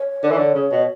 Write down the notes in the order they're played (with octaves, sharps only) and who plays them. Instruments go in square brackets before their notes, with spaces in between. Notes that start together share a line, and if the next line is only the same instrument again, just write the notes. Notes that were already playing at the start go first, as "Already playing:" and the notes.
Already playing: [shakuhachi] C#5
[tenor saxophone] D3
E3
D3
C#3
B2